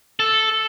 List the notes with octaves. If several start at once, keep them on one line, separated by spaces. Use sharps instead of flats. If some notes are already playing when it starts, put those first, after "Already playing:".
A4